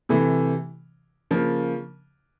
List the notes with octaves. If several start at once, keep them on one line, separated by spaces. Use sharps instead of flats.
C3 E3 A3
C#3 F3 A#3